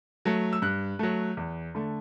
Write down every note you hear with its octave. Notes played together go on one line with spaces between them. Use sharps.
F#3 A3
E6
G2 F#6
F#3 A3
E2
D3 A3